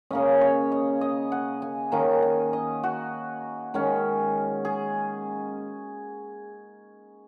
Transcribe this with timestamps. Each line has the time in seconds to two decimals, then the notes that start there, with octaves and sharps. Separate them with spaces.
0.11 C#3 A#3 C#4 D#5
0.41 C#5
0.72 D#5
1.01 D#5
1.32 F#5
1.62 G#5
1.92 D#3 A#3 C#4 A#5
2.22 G#5
2.53 D#5
2.84 F#4
3.74 D#3 G#3 C#4
4.65 G#4